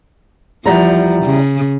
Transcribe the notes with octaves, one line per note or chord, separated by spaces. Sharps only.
E2 F3 G3 A#5
C#3